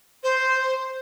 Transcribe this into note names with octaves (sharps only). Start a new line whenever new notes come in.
C5